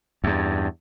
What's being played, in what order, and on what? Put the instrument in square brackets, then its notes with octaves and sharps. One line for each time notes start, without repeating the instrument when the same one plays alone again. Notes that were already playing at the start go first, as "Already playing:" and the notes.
[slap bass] E2 G2